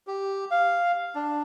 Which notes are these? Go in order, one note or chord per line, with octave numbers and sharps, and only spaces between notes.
G4
F5
D4